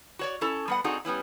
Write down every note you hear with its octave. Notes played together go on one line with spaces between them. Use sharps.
F#4 C#5 D5
C#4 E4 A4
G3 B3 F#5
C4 D4 D#4 F#4 G#4 A4
G3 B3 C#4 E4